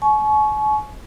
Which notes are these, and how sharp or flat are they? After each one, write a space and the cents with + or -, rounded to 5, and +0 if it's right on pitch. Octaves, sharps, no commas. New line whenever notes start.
G#5 +45 C#6 +0